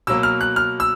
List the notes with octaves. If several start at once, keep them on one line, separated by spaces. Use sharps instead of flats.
B2 F#3 A#3 E6
F6
F#6
F6
E6